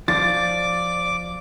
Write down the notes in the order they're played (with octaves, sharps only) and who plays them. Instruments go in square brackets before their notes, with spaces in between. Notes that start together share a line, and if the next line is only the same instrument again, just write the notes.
[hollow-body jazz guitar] F3 [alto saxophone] D5 [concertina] D6 [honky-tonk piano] A6